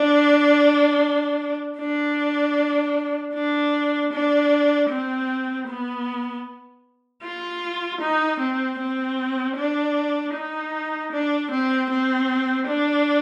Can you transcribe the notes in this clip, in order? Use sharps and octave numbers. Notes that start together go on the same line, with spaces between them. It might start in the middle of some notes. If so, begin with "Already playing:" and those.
Already playing: D4
D4
D4
D4
C4
B3
F4
D#4
C4
C4
D4
D#4
D4
C4
C4
D4